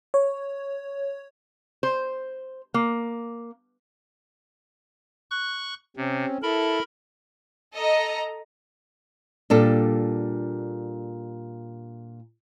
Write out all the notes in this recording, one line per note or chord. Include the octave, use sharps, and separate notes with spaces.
C#5
C5
A#3
C#6 F#6
C3 C4 C#4
E4 A4 A#4 A5 B5
A4 D#5 A#5
A#2 G3 D4 A4